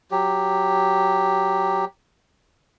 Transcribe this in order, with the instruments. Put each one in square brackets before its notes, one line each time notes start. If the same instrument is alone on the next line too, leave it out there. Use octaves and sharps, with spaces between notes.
[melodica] F#3 G4